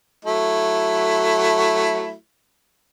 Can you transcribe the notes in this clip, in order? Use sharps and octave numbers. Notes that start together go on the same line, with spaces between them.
F#3 A3 E4